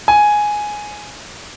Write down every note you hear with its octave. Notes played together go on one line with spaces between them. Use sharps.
G#5